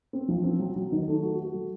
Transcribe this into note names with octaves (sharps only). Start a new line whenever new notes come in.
C4
F3
C4
F#3
F#3
D#3
A3
F#4
F#4
F#3